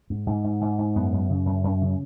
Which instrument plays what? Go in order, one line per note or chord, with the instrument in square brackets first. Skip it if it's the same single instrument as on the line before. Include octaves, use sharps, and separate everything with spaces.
[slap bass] G#2
G#2
G#2
G#2
G#2
F#2 B3
F#2
C#3
F#2
F#2
C#3